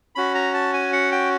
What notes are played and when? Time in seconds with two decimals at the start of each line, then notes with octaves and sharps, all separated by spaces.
0.15 C#4 F#4 B5
0.35 A#5
0.54 A5
0.74 G#5
0.93 F#5
1.12 G5